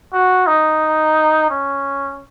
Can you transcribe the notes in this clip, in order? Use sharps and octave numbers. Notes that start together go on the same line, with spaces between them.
F#4
D#4
C#4